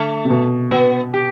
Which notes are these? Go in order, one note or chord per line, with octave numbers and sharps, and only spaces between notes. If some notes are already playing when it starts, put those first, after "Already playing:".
Already playing: D3 A3
C3
B2
B2 B3
G4